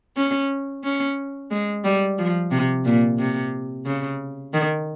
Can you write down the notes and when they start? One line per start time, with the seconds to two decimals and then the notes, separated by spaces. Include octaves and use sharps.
0.17 C#4
0.84 C#4
1.51 G#3
1.85 G3
2.19 F3
2.51 C3
2.85 A#2
3.19 C3
3.86 C#3
4.54 D#3